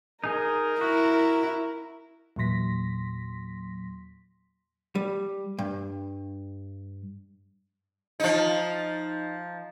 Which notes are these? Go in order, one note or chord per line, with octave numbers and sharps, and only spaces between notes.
D#4 G#4 A#4 D#5
E4 F#4
E2 A#2 F#3 C6 A#6 B6
G3
G2
F3 D#4